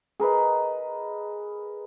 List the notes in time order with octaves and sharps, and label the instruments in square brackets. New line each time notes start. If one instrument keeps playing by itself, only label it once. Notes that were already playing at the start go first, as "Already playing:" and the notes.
[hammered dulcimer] G#4 A#4 B4 D#5